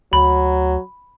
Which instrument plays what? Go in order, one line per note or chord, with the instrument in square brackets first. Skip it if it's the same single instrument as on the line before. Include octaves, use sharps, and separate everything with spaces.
[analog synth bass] D2 [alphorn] F#3 [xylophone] B5